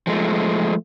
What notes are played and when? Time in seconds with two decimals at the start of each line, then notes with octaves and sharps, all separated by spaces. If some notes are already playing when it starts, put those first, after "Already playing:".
0.07 F3 G#3 A3